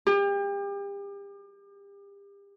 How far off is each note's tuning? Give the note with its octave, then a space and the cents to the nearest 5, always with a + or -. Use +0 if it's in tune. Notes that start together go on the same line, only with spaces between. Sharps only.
G4 +35